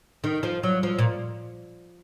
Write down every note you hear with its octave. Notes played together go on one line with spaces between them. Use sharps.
D#3
F3
F#3
F3
A#2